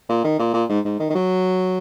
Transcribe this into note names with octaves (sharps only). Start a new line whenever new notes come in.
A#2
D#3
A#2
A#2
G#2
G#2
D#3
D#3
F#3